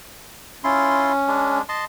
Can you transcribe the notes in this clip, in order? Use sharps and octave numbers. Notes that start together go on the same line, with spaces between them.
C#4 E4 F4 C6
G#3 D4
D#5 A5 C6